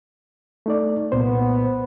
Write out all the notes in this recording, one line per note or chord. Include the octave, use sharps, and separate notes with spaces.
A3 D#4 D5
C2 A#2 B3 C5